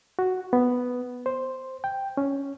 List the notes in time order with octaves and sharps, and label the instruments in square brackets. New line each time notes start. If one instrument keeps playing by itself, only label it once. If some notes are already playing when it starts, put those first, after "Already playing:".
[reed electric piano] F#4
B3
C5
G5
C#4